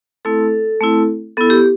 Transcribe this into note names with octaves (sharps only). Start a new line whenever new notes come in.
A3 C4 E4 A4
A3 C4 E4
B3 E4 A4
G4